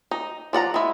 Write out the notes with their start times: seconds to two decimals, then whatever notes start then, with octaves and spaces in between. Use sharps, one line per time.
0.11 D#4
0.53 F3 D5 F#5 A#5
0.74 G#3 E4